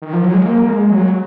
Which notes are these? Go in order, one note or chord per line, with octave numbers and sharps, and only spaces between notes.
D#3
F3
F#3
G#3
A#3
G#3
F#3